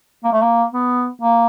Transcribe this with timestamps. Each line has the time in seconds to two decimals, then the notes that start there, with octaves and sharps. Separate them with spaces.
0.24 A#3
0.32 A3
0.42 A#3
0.73 B3
1.22 A#3